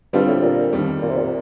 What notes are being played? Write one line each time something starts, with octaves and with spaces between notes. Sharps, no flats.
G2 D3 G3 C4 F4
A2
A#2
F2 D#3 G3
A#2
C3
A#2